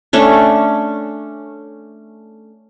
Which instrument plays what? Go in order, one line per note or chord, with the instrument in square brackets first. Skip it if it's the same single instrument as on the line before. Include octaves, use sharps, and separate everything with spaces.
[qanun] A3 C#4 D4